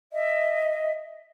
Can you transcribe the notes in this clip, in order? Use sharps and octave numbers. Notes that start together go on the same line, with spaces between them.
D#5 E5